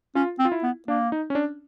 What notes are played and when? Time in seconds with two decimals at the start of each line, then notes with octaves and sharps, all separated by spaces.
0.15 C#4 F4
0.39 C4
0.45 F4
0.52 E4
0.63 B3
0.88 A#3 D4
1.12 D#4
1.30 C#4
1.35 D4